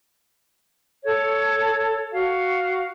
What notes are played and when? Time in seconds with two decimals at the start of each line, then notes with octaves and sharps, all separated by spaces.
1.05 A4 C#5
2.14 F#4 F5